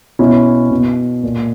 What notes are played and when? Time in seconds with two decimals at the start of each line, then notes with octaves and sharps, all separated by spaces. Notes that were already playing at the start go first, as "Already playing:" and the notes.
0.19 B2 C#4 E4
0.71 B2
1.23 A#2